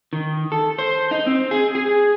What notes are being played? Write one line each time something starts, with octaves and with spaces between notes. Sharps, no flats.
D#3
A4
C5
D#4
C4
G#4
G#4